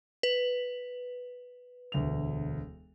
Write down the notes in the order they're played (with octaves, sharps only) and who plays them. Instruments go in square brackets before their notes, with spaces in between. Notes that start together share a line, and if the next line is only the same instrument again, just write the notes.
[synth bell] B4
[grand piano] E1 D2 F7